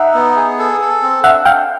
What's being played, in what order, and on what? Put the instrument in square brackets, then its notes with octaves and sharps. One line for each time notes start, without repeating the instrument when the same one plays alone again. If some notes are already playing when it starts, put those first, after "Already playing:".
Already playing: [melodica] D#4 [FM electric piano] E5 F#5
[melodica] B3
G#4
A4
A4
C4
[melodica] D4 [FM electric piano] E5 F#5
[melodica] D4 [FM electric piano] F5 G5